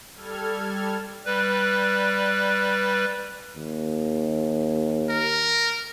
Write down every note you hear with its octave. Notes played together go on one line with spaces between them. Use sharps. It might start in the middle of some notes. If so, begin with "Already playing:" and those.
G3 A4 F6 G#6
G3 B4
D#2
A#4